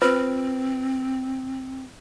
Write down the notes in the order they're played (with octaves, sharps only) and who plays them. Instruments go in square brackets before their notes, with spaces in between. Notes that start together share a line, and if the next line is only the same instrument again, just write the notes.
[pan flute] C4 [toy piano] F4 B4 C5